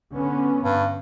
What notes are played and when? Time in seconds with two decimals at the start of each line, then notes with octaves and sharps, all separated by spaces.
0.15 D3 B3 C#4
0.63 G2